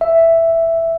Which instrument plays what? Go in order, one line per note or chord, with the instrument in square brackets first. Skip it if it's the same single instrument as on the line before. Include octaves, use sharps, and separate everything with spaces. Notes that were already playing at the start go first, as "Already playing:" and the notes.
[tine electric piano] E5